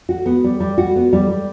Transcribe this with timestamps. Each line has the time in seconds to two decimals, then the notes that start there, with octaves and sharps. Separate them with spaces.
0.09 F#4
0.26 B3
0.44 G3
0.60 G3
0.78 F#4
0.96 B3
1.13 G3
1.30 G3